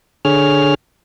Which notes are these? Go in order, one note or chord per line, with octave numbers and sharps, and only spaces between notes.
D3 G#4 C#5 F6